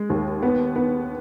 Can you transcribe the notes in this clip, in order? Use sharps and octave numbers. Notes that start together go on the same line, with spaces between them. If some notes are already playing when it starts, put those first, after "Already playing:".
Already playing: G#3
D#2
B3
B3